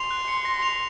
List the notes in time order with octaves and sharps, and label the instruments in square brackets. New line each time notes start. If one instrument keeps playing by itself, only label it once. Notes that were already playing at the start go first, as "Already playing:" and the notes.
Already playing: [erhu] C6 [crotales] F7
[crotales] F#6
C#7
A#6
F7